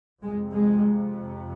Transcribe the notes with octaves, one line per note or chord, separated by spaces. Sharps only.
F2 C3 G#3
G#3